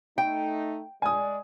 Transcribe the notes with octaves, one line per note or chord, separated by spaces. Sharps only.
A3 D#4 G5
G#3 D5 G#5 D#6